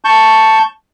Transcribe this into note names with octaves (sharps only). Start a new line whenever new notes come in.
A5 C#6 G6